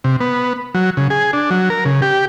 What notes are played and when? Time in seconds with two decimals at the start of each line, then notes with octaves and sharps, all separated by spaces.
0.04 C3
0.21 B3
0.75 F#3
0.97 C#3
1.10 G#4
1.33 D4
1.51 F#3
1.70 A#4
1.85 C#3
2.02 G4